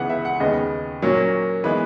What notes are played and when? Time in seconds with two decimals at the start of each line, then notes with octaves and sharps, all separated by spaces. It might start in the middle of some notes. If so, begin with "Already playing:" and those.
Already playing: C#2 C#3 E3 B3 F#5
0.09 E5
0.25 F#5
0.40 D#2 C#3 G#3 B3 D#5
1.02 A#2 F#3 A#3 C#4
1.64 E3 G#3 B3 B4